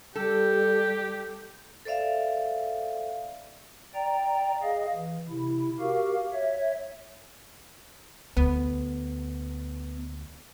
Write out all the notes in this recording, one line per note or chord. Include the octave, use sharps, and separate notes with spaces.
G3 G4 A4
A4 C5 D5 E5 F5
D5 G5 A#5
G#4 D#5 F5
E3
C3 E4
F#4 G4 A#4 F5
C#5 E5
D2 B3